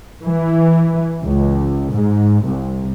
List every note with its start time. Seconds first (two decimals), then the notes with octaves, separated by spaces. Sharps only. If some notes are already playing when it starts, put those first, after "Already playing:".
0.24 E3
1.24 C#2
1.93 G#2
2.45 C2